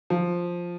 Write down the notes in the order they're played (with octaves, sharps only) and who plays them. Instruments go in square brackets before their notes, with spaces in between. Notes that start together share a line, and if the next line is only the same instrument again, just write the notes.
[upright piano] F3